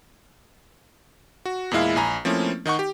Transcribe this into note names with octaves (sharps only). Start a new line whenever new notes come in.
F#4
E2 A#2 G#3 E4 F5
A#1 G#5 A#5 B5
F3 A3 A#3 C4 C#4 E4
D#3 D#4 F#5 C#6
G4